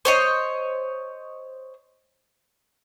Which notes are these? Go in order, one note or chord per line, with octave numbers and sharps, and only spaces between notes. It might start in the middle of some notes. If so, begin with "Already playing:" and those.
C5 C#5 D#5